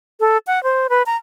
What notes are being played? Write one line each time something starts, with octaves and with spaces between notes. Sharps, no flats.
A4
F#5
C5
B4
A#5